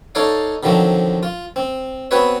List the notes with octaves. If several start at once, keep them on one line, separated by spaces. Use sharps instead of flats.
D#4 A4 C#5 D5 F5
D3 D#3 F3 F#3 C4
F4
C4
B3 C4 F#4 B4 C#5 E5